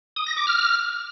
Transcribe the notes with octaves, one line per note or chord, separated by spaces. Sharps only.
D#6
A#6
D6
F6